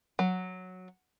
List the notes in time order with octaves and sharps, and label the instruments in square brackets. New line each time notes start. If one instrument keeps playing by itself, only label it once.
[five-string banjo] F#3